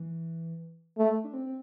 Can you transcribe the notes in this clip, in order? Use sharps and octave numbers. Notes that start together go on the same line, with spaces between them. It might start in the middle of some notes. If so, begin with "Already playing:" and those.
Already playing: E3
A3
D4
C4
C4